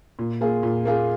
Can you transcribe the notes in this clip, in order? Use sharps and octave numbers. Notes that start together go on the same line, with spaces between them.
A#2
A#3 F4 G#4
A#2
A#3 F4 G#4